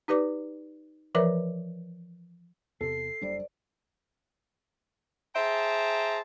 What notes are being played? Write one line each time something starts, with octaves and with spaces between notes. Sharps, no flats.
D#4 G4 B4 D5 D6
E3 F3 A#4 B4 D5 E5
E2 C3 A4 C7
F#1 G3 D4 C5 D5
G#4 C5 E5 G5 A5 A#5